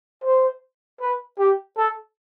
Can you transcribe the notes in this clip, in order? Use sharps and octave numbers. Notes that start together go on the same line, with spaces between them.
C5
B4
G4
A4